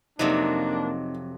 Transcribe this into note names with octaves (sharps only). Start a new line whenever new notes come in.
F2 C3 F#3 A#3 D4 D#4